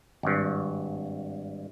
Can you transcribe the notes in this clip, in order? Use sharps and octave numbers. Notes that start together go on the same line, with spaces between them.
G#1 G2